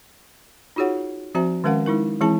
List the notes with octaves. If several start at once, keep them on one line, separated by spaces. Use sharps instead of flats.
D#4 F4 F#4 G#4 C#5 F#5
F3 C4 F#4 C5 E5 A#5
D#3 G#3 C#4 A#4 F5 F#5
G#3 D#4 E4 A#4
E3 G#3 C4 E4 G#4 A5